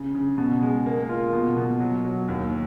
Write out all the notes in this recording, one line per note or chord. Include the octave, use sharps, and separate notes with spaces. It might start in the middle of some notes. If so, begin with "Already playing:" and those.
Already playing: C#3
C#3
B2
G#3
A#3
F4
B2
B2
F#3
F#3
D#2